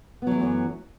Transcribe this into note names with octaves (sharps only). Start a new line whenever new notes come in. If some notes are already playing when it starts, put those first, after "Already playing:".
F#2 E3 F#3 A3 B3